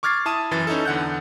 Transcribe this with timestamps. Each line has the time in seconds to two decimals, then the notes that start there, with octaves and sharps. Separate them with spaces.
0.03 C#6 D6 F6 G#6 A6 C7
0.26 E4 A5 D#6 D#7
0.51 F#2 E3 A6
0.67 C#4 D#4 E4 A4
0.85 E2 D3 F#5 F#6 G6